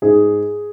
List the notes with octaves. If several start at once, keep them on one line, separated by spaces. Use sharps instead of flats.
G#2 G#4